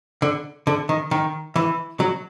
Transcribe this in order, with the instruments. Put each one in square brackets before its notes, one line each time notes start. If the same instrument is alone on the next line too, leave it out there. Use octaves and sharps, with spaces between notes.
[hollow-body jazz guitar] D3
D3
D#3
D#3
E3
F#3